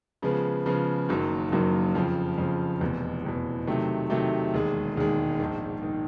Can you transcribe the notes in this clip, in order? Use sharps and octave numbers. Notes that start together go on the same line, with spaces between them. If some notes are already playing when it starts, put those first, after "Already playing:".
C#3 F3 G#3 B3
C#3 F3 G#3 B3
F#1 F#2 D#3 F#3 A#3
F#1 F#2 D#3 F#3 A#3
F2 C#3 F3
F2 C#3 F3
F1 E2 B2
F1 E2 B2
C3 D#3 F#3 A3
C3 D#3 F#3 A3
E1 D#2 D#3 G#3
E1 D#2 D#3 G#3
A#1 G#2 D#3
D#3